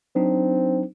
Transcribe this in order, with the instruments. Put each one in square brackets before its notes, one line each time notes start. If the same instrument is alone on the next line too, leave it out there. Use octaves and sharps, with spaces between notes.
[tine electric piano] F#3 D4 D#4 [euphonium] C4